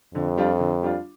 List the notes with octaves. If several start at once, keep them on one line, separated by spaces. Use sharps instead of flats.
F2 D3
G3 D4 F4
D3
G3 D4 F4